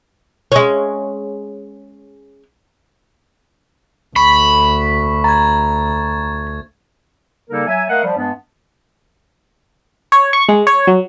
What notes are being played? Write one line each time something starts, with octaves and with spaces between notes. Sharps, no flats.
G#3 C#4
D2 B5 C#6
A#5 G#6 A6
C#3 G3 A#3 D#4 A4 A#4
F#3 E5 G#5
A3 A#4 D#5 F5 F#5
F3 G3
G2 G#3 B3 D4
C#5
C#6
G#3
C#5
F#3